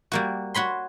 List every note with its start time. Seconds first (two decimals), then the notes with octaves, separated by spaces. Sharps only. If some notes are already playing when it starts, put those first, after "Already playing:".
0.12 G3 A#3 F#4
0.54 F#4 C#5 B5 C6